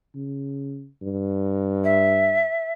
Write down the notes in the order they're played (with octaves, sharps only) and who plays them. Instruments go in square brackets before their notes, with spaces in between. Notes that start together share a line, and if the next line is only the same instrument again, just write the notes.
[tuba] C#3
G2
[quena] E5